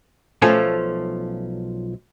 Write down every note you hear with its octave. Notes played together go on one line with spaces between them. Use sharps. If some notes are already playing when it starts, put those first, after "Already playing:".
B1 F3 A3 C#4 F4 G#5